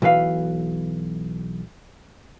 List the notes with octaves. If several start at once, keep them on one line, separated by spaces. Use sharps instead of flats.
B1 E3 B4 F5